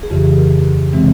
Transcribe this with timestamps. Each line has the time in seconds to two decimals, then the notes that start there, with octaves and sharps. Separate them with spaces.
0.03 G#4
0.10 F2 C#3 E3 G4
0.24 G#4
0.38 A#4
0.93 C3 E3 G#3 C4